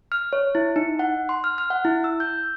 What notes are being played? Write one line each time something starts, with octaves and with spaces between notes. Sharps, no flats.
F6
C#5
E4
D#4
F#5
C6
F6
F6
F#5
E4
E6
G6